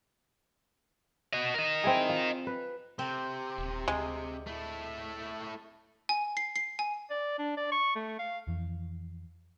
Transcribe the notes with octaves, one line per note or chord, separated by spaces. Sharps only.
F#4 D#5
A#4 D#5
C4 E4 G#4
F4
B4
C3 C4
D#1
D2 G#3
A3 E4
G#5
C7
C7
G#5
D5
D4
D5
C#6
A3
F5
F2 E3